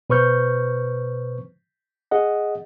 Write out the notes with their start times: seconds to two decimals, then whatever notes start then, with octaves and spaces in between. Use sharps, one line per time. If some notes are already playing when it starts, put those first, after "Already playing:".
0.10 B2 B4 C5 C#6 F6 G6
2.11 G#4 D#5 F#5